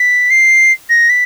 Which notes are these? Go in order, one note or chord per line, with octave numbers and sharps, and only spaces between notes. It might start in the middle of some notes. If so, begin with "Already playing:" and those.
Already playing: B6
C7
A#6
B6